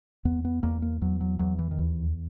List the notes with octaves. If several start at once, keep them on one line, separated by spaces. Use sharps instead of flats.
E2 B3
B3
E2 A#3
A#3
E2 F#3
F#3
E2 F#3
E3
D#3
D#2 E3